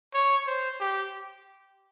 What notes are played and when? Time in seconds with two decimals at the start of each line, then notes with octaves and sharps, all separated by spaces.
0.14 C#5
0.46 C5
0.80 G4